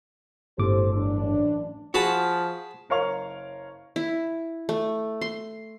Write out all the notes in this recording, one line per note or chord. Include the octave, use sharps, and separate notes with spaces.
G1 A2 G4 A4 C5 D6
A1 F#2 D4
F3 F#4 G#4 A5 B5
F#1 A#4 C#5 F5 C#6 F7
E4
A3
C6